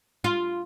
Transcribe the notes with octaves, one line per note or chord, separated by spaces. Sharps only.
F4